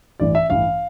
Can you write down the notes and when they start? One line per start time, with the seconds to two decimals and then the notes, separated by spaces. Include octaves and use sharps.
0.20 A1 G2 E3 D5
0.35 E5
0.50 A1 G2 E3 F5